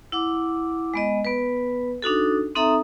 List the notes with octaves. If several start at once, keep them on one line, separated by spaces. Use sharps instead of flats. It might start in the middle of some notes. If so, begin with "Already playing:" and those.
E4 F#5 D6
G#3 B3 D#5
B3 B4
D4 D#4 F#4 A4
C4 D#4 A4 E5 A#5 D#6